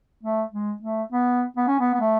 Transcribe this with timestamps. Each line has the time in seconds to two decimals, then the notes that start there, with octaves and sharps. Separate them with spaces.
0.23 A3
0.53 G#3
0.82 A3
1.12 B3
1.57 B3
1.68 C#4
1.80 B3
1.94 B3
2.01 A3